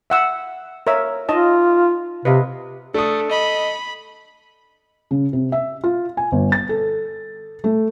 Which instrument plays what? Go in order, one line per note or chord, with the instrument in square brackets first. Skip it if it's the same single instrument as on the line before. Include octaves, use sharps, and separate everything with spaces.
[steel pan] E5 F#5 E6
A#4 C#5 E5
[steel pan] D#4 D#5 A5 [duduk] F4
[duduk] C3 [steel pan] B4 D#5 F5
[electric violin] A3 [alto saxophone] D4 [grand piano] A4 D#6
[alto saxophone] D#5 [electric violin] B5
[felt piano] C#3
C3
E5
F4
G#5
G1
A6
A4
A3